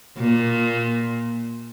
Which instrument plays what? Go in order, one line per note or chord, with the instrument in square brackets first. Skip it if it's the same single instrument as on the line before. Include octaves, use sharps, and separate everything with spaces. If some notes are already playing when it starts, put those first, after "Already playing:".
[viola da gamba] A#2